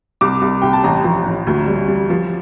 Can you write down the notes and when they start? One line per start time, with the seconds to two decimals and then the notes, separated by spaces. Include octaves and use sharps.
0.21 C2 D6
0.42 C2
0.62 C2 G5
0.73 A5
0.84 A1 A#5
1.04 F3
1.26 A1
1.47 D2
1.68 G3
1.88 G3
2.10 F3